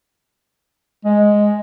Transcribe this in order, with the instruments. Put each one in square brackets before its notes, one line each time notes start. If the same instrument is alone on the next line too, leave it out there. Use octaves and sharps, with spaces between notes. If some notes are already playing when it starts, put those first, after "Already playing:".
[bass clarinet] G#3